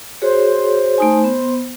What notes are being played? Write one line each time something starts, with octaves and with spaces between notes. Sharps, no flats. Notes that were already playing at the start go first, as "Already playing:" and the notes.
F#4 G#4 C5 C#5
A3 D#4 G#5
B3